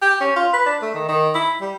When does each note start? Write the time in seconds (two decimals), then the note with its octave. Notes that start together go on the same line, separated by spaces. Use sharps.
0.02 G4
0.20 C#4
0.36 F4
0.53 B4
0.66 D4
0.82 A3
0.94 D#3
1.09 D#3
1.35 E4
1.61 G3